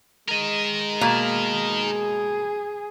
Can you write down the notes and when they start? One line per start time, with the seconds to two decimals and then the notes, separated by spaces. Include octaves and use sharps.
0.29 G#3 A#4 D#5
1.01 B2 A#3 F5
1.83 G#4